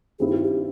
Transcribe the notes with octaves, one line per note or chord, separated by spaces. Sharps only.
G2 D#3 G3 C4 E4 G#4
G4
F#4
G4